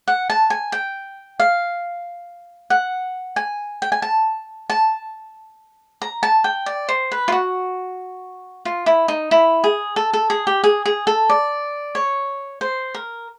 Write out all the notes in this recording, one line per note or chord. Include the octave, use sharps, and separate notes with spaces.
F#5
A5
G#5
G5
F5
F#5
G#5
G5
G#5
A5
A5
A#5
A5
G5
D5
C5
B4
F4
F#4
F4
E4
D#4
E4
G#4
A4
A4
G#4
G4
G#4
G#4
A4
D5
C#5
C5
A#4